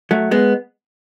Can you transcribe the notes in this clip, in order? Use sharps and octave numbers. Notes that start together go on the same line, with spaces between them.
F#3 A3
G#3 B3